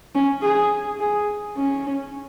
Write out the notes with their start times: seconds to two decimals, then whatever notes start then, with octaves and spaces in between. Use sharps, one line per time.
0.15 C#4
0.42 G#4
1.00 G#4
1.56 C#4